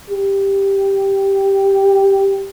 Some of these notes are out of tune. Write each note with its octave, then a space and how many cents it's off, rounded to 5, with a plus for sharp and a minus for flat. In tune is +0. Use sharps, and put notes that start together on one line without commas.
G4 +0